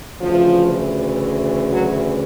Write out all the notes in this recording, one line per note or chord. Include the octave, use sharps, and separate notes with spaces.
D2 C#3 E3 F3
F#3